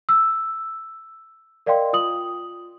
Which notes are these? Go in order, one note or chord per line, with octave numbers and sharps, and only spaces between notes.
E6
A#4 D5 D#5 F5 G5 C6
F4 D#6 F#7